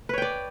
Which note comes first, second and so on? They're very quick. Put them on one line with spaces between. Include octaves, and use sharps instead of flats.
B4 C#5 G5 D5